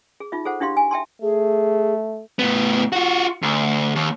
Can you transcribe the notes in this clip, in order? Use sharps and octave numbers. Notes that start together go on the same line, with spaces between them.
G#4
D#4 F4 E5
G#4 A4 C5 F#5
D4 E4 G4 F5 C6
G#5
E5 G5 A5 C6
A3 G#4
A2 B3
F4 F#4
D2
D#2